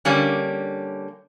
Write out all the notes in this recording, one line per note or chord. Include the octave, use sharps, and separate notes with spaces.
D3 G3 A#3 C#4